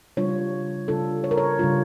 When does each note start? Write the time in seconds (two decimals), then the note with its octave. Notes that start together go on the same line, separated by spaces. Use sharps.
0.17 C#3 G3 D4 F4 C#5
0.88 C#3 G3 D4 F4 A4
1.24 C#5
1.31 A#4
1.38 C#5
1.59 C#3 G3 D4 F4